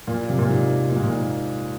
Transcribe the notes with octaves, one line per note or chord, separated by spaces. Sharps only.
A#2
C3
A#2
G#2
A#2
G#2
A#2